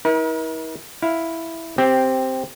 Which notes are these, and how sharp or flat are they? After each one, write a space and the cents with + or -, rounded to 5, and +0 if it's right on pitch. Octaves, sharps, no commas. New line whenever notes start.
E4 -45 A#4 +40
E4 +0 F5 +0
C4 +0 G4 -10